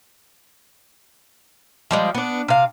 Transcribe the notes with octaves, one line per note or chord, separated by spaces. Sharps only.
F3 G3 G#3
B3 D4
C3 F5